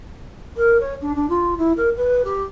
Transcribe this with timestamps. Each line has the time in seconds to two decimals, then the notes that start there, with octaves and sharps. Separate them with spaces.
0.56 A#4
0.80 C#5
1.01 D4
1.15 D4
1.29 F4
1.58 E4
1.77 A#4
1.97 B4
2.24 G4